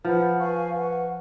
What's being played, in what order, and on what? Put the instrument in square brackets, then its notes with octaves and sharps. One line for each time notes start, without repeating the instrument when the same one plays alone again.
[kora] F3 [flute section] B4 F#5 B5
[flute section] B4 F5 G#5 C#6
B4 F#5 C#6